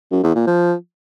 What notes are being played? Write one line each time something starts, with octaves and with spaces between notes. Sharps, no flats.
F#2
E2
A#2
F3